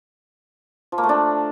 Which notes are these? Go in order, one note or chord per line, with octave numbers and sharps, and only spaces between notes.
F3
A#3
A3
D4